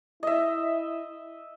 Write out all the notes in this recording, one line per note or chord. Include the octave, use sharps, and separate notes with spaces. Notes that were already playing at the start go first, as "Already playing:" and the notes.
E4 D#5 E5